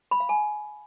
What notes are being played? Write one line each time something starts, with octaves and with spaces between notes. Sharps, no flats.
B5
F5
G#5